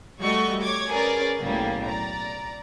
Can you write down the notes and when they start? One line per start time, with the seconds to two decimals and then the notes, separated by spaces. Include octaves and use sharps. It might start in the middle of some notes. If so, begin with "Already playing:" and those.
0.21 G3 A3 F#4 D#5 C#6
0.62 C#5 D6 G#6
0.91 C#4 G#4 A#4 B4 D5
1.41 B1 A2 C#3 F#3 G3 A#3
1.86 D5 A#5